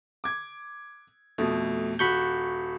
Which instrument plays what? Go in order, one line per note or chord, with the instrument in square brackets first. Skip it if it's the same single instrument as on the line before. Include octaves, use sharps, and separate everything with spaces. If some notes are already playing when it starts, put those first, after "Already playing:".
[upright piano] D6 G#6
[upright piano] F2 B2 [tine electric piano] A3
[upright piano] D#1 F#4 [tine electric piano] B5 C#6 G6